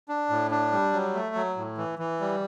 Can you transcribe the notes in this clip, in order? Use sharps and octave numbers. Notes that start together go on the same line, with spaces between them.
D4
A2
D4
G3
F#3
A3
F#3
A2
E3
E3
G3